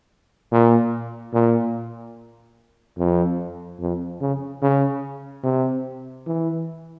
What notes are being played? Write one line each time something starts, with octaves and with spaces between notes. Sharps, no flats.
A#2
A#2
F2
F2
C#3
C#3
C3
E3